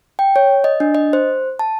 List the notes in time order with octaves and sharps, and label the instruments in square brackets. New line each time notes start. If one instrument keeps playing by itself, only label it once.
[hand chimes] G5
C#5
D#5
D4
D#5
C5
A5